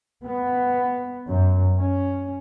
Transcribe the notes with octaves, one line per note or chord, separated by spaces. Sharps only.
B3
F#2
C#4